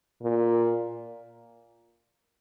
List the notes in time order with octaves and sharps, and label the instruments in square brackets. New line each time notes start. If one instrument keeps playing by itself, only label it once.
[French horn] A#2